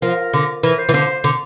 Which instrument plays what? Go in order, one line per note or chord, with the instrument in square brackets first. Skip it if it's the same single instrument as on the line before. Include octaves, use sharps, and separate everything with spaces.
[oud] F3 [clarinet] A#4
[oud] D3
[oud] E3 [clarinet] A#4
[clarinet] C5
[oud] E3
[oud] D3 [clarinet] C5
[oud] D3